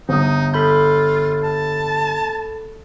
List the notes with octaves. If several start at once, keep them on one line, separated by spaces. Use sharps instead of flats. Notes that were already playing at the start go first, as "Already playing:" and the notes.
G1 D#4 D#6
F4 A4 B5 G6
A5